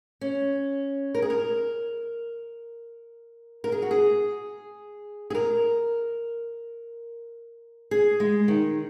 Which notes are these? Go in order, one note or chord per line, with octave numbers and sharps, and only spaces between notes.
C#4
A#4
G#4
A#4
A#4
G#4
F#4
G#4
G#4
A#4
G#4
G#3
D#3